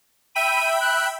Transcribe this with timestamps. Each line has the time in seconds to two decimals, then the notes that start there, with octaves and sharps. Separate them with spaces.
0.35 E5 G5 B5 D#7
0.81 F#6